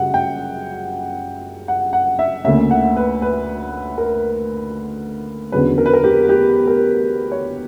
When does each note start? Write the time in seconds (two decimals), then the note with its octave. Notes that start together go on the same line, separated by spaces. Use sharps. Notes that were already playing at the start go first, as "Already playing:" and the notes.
Already playing: F#2 C#3 G3 F#5
0.14 G5
1.68 F#5
1.93 F#5
2.19 E5
2.45 D2 D3 A#3 C#4 E5
2.71 F#5
2.96 B4
3.22 B4
3.98 A#4
5.52 E2 D3 F#3 C#4 B4
5.78 A#4
5.86 B4
5.94 A#4
6.04 G4
6.29 G4
6.67 A#4
7.32 C#5